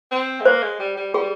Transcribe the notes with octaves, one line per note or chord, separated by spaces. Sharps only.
C4
G#3
A#3 C5
G#3
G3
G3
G3 G#4